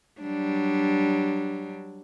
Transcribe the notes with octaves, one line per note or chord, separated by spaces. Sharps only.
F#3 G3 D4